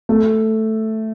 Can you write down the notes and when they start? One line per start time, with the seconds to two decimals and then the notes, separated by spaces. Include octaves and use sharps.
0.09 A3